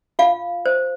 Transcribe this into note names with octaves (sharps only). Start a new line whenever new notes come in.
F4 F5
C5